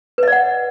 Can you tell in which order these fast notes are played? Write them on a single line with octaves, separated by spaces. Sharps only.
B4 D#5 D5 F#5